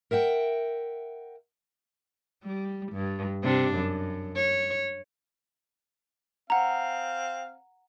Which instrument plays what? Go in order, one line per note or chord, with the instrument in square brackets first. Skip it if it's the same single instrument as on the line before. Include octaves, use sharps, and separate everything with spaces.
[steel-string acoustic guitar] A#4 E5 F#5 G5
[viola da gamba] G3
G2
C3 D4
F#2
C#5
[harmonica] C4 F5 [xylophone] F#5 A#5